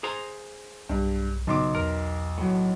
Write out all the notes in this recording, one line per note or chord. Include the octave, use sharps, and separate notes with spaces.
G#4 C5 A#5
B1 G2
B1 C#3 C6 D6
E2 A#4
A2 F#3